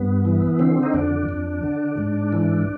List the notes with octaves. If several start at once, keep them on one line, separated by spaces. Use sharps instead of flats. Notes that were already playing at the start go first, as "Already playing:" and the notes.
Already playing: G2 B3
E3
D3 C4
D#4
F2 D4
F2
D3
G#2
E3